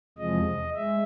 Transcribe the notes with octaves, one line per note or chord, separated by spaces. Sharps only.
E2 C3 F3 G#3 D#5
G#3 E5